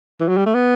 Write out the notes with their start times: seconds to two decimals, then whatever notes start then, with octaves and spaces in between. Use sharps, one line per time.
0.20 E3
0.28 F#3
0.37 G3
0.46 A3
0.55 B3